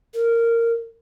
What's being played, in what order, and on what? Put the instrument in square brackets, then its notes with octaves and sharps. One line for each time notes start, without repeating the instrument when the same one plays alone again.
[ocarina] A#4